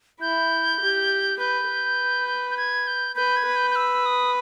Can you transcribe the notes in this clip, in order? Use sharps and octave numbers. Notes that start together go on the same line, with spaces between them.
E4 G6
G4
B4 G6
B4
G6
G#6
G6
B4 G6
G#6
B4
G6
G6
E6
D#6